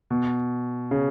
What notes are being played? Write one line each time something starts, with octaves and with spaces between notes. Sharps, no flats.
B2
C#3